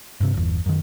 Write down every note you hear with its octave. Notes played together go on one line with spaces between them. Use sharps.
G2 C3
G1 E2
F#2 D#3